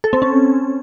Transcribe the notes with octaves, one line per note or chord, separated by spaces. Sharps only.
A4
C4
C#4